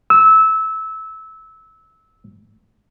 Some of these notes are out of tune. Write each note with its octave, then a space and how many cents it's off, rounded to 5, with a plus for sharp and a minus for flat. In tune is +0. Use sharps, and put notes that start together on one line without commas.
E6 -20